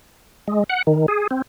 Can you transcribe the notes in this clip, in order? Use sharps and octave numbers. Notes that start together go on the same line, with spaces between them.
G#3
F#5
D#3
G#4
C4